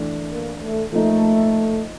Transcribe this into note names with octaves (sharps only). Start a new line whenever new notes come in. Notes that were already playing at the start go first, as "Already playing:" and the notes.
Already playing: E3 A3 D4
A#3
A3
F3 A3 A#3 D#4